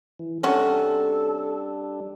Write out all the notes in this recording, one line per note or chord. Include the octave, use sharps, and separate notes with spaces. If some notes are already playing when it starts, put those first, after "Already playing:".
E3
C3 G3 C#4 D4 F#4 A4